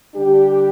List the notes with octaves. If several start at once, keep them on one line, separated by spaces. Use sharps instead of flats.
D3 G3 D4 G4